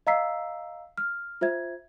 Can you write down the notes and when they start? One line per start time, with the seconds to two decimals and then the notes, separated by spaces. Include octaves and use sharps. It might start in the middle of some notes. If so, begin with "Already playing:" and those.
0.07 D#5 F5 A#5 E6 B6 C7
0.98 F6
1.41 F4 C5 E5 G#6